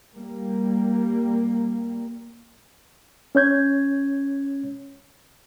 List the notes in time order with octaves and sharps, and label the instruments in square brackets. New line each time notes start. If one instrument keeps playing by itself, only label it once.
[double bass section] G3 A#3
[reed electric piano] C#4 C#5 G6 G#6